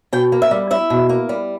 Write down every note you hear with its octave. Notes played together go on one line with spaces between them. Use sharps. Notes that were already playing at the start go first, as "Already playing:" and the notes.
B2 G5
A#3
E5
G3
E4 E5
B2
A#3
G3